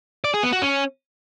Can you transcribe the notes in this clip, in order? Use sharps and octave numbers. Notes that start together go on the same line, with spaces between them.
D5
G#4
B3
F#4
C#4